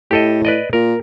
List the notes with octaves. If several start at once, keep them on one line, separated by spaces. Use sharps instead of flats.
A2 G4 A4 D#5
B4 D5 D#5
A#2 A#4